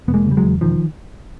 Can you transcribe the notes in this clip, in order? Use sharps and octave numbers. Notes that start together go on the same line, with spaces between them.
E1 B3
G#3 A#3
C#3 G3
F#3 G#3
E2
E1 D#3 F3